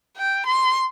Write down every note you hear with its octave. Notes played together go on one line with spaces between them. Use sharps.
G5
C6